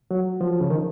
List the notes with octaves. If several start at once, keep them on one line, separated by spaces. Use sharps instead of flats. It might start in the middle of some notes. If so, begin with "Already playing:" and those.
F#3
F3
C#3
D#3